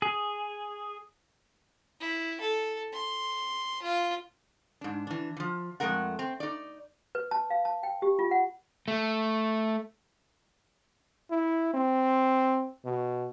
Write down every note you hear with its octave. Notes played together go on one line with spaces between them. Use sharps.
G#4
E4
A4
C6
F4
G#2 D4
E3 D4
E3 F3
F2 E3 G#3 A3 A#4 F#5
C4
D#4 D5
B4
A5
F5
A5
G5
G4
F4
F#5
A3
E4
C4
B2